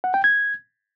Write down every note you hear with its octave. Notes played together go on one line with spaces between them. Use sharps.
F#5
G5
G#6